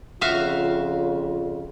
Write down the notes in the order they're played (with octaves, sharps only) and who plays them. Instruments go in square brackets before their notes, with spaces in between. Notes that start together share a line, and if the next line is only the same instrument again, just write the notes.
[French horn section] F2 C#3 F4 [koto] F#4 E5 F5